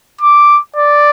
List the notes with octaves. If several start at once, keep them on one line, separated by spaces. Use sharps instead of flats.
D6
D5